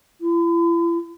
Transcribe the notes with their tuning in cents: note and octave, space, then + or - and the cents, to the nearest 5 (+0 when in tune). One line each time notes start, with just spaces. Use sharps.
E4 +45